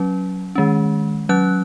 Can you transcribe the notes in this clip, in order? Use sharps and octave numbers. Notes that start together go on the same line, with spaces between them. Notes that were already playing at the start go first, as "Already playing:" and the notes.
Already playing: F#3 C#4
D#3 G#3 C#4
F#3 C#4 F#6